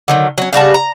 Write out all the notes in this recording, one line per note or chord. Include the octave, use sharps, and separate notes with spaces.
D3 D#3 F#3
F#3 C#4
C#3 G3 F#4 A5
A#5